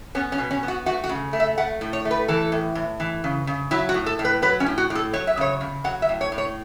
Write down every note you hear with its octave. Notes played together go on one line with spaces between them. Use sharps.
B3 C#4
C#4
B2
C#4
B3
F#4
A3 F#4
F#4
C#3
A3
E5
A3 F#5
A2
C#5
A3
B4
E3 A4
A2
A2
E3
C#3
C#3
F#3 E4
F#4
A2
A4
A2
B4
F#3 B4
C#4
A2
F#4
A2
A4
F#3 C#5
E5
C#3 C#5
C#3
F#3 F#5
E5
A2
C#5
A2
C#5